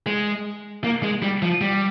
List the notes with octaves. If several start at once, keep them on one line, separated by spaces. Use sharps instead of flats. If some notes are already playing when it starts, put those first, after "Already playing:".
G#3
A#3
G#3
G3
F3
G3